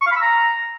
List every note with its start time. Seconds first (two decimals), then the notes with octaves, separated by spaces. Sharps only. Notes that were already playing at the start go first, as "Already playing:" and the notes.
0.01 C#6
0.06 F5
0.12 B5
0.17 E6
0.22 A#5